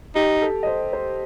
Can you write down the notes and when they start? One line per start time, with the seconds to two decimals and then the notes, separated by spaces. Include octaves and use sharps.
0.15 D#4 G4
0.42 A4
0.63 D#5
0.67 C5
0.93 C5